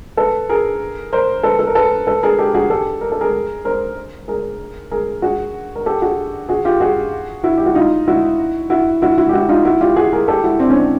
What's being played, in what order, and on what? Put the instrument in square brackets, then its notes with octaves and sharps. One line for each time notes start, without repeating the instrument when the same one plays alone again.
[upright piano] A4 B4
G#4 A#4
A#4 C5
A4 B4
A4
A#4
A4 B4
A4 B4
G#4 A#4
G4 A4
F#4 G#4
G4 A4
A#4
A4
G#4 A#4
A#4 C5
G#4 A#4
G#4 A#4
F#4 G#4
A#4
G4 A4
F#4 G#4
F#4 G#4
F4 G4
F#4 G#4
E4 F#4
G4
F#4
D#4 F4
E4 F#4
E4 F#4
E4 F#4
E4 F#4
G4
E4 F#4
D#4 F4
E4 F#4
F4 G4
F#4 G#4
G#4 A#4
G4 A4
E4 F#4
C4 D4
C#4
C4 D4